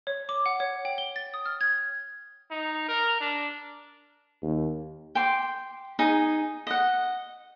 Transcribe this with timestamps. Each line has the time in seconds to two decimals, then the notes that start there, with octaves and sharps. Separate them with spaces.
0.07 C#5
0.29 D6
0.46 F#5
0.60 C#5
0.85 G5
0.98 G7
1.16 A6
1.34 D#6
1.46 F6
1.61 G#6
2.51 D#4
2.88 A#4
3.21 D4
4.43 D#2
5.15 G5 C6 D6
5.99 D#4 G#4
6.67 D#5 F#5